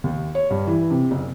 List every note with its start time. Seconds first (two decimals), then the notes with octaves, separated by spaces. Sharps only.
0.04 D#2
0.35 C#5
0.50 G2
0.67 E3
0.91 C3
1.11 F#1